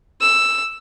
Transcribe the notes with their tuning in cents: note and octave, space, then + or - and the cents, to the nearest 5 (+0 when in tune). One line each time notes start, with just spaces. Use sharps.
E6 +5